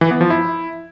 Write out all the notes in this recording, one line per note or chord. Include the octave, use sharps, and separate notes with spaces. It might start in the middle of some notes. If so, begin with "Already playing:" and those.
E3
B3
F3
E4